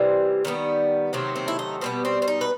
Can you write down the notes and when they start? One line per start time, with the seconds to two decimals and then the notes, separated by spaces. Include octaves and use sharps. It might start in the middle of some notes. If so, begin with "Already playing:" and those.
Already playing: C3 E3 G3 C4
0.45 D#3 G3 B3
1.13 C3 D#3 F#3 A3 C4
1.36 C4
1.48 E4
1.59 D#4
1.81 B2 G3 B3 C4
2.05 C4
2.22 C4
2.28 D#4
2.41 B4